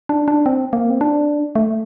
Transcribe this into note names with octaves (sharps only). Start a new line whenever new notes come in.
D4
D4
C4
A#3
C4
D4
A3